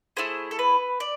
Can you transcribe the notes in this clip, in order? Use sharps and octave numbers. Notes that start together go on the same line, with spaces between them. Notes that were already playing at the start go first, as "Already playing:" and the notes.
A3 E4 G#4 C5
A4
B4
D5